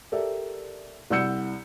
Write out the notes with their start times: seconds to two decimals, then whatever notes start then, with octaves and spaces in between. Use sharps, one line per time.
0.12 G4 A4 A#4 D5 E5
1.10 C2 D5 F#5 E6 G6 C#7